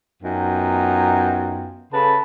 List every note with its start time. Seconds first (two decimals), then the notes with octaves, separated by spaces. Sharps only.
0.23 F#2 B3 D#4 F4 G5
1.93 C#3 A4 B4 A5 B5